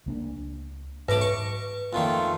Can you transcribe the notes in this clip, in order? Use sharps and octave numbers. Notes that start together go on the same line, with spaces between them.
C#2 A#3 D4
B1 G#2 B4 E5 D6
C#6
F2 A#2 D#3 A3 F4